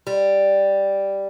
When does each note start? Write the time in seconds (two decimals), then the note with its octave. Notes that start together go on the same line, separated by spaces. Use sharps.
0.07 G3